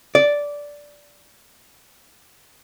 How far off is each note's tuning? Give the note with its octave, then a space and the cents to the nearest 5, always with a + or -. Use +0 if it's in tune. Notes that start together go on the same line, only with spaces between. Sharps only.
D5 -10